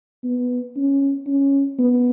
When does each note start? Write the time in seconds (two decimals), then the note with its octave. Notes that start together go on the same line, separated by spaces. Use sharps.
0.24 B3
0.76 C#4
1.27 C#4
1.79 B3